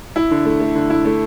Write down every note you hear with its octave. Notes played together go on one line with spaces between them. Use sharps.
E4
D3
A3
A3
D3
E4
A3